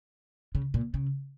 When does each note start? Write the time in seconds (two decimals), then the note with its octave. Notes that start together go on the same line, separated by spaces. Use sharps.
0.55 C#3
0.74 A#2
0.94 C#3